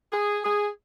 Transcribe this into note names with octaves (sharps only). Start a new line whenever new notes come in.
G#4
G#4